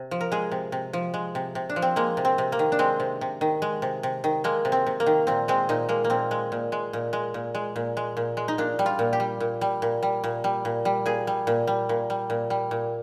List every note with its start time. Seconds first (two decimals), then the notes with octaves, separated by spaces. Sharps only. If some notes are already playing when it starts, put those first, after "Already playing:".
Already playing: C3
0.11 F3
0.21 A#4
0.32 G#3 G#4
0.52 C3
0.72 C3
0.93 F3
1.14 G#3
1.35 C3
1.55 C3
1.69 D4
1.76 F3
1.82 C4
1.96 G#3 A#3
2.17 C3
2.25 C4
2.38 C3
2.52 A#3
2.59 D#3
2.72 D4
2.79 G#3 C4
3.00 C3
3.21 C3
3.41 D#3
3.62 G#3
3.82 C3
4.03 C3
4.24 D#3
4.44 G#3 A#3
4.65 C3
4.72 C4
4.87 C3
5.00 A#3
5.06 D#3
5.27 A#2 C4
5.48 G#3 C4
5.69 A#2 D#4
5.89 G#3 A#3
6.04 A#3
6.10 A#2 C4
6.31 G#3
6.52 A#2
6.72 G#3
6.93 A#2
7.13 G#3
7.34 A#2
7.55 G#3
7.76 A#2
7.97 G#3
8.17 A#2
8.37 G#3
8.48 D#4
8.58 A#2 D4
8.79 G3
8.86 F4
8.99 A#2
9.13 G4
9.20 G3
9.40 A#2
9.61 G3
9.82 A#2
10.03 G3
10.24 A#2
10.44 G3
10.65 A#2
10.85 G3
11.06 A#2 G#4
11.27 G3
11.47 A#2
11.67 G3
11.89 A#2
12.10 G3
12.30 A#2
12.50 G3
12.71 A#2